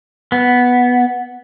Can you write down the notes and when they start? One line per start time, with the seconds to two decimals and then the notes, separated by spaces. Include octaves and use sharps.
0.32 B3